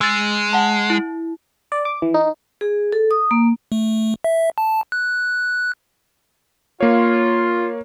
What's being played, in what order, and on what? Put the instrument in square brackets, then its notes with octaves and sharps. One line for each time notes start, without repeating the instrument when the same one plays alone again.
[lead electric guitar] G#3 [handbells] E6 A6
[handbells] F#5 A5
E4
[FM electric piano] D5
D6
E3
D#4
[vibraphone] G#4
A4
D#6
A#3
[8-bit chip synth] A3
E5
A5
F#6
[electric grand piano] A#3 C#5 [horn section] F4